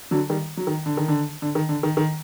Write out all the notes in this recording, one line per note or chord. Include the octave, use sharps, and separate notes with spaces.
D3 F#3
D#3 G3
F#3
D#3
D3
D#3
D3
D3
D#3
D3
D#3
D#3